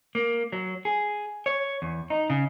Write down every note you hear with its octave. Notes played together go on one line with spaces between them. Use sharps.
A#3
F#3
G#4
C#5
E2
D#4
C#3